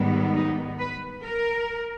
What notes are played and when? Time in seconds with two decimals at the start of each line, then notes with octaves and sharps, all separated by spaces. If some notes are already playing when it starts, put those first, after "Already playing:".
Already playing: G#2 D#3 G3 B3
0.34 D#4
0.78 B4
1.24 A#4